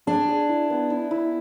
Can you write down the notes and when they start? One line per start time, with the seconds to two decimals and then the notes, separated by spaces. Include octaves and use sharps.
0.07 D4 G#4
0.29 G#4
0.49 E4
0.70 B3
0.90 E4
1.11 E4